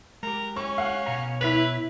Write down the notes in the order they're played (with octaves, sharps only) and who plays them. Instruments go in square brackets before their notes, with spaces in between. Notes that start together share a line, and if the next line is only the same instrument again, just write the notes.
[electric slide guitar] G#3 G4 [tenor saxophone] A#4
[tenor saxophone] C#4 [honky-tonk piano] C#6
[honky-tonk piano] F5 F#5
[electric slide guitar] B2 C#5 A#5
[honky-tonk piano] E4 B6 F7 [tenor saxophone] B4